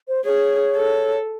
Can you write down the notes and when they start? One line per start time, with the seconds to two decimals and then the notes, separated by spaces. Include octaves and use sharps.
0.08 C5
0.25 G#4 C#5
0.76 A4